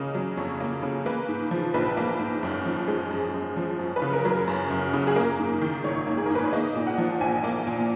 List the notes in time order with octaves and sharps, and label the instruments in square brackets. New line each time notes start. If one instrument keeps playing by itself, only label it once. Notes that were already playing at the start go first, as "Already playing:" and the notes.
Already playing: [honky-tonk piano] C#3 A#3 D#5
F#3
F2 C#5
A#3
C#3
A#3 B4
G#2
F3
A#1 B4
A#3
G#2
F#2
F3
G#3
F#2
F#2
F3
F#2
B4
C#3
A#4
F#3
A#4
F#2
F#2
C#3
G#4
A#3 A#4
G#2
D#3
G#1 C#5
A#3
G#4
A#4
G#2 B4
C#5
A#3 D#5
A#2
F#5
F3
A#1 G#5
A#3
A#2